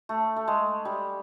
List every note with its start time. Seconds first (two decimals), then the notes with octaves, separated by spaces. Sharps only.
0.09 A3
0.36 A3
0.48 G#3
0.85 G3